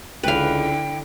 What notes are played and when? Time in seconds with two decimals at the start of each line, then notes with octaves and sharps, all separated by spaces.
0.23 C#2 D3 E4 B4 F5 G5